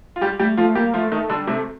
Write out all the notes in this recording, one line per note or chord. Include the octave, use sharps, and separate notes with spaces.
F4
G3 G4
G3 A3 G4
F3 A3 F4
G3 A#3 G4
F3 A3 F4
D#3 A3 D#4
D3 G3 D4
C3 A3 C4